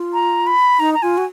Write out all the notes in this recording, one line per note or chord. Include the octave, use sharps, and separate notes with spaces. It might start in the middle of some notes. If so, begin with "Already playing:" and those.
Already playing: F4
A#5
B5
D#4 A#5
A#5
F4 G#5
F#4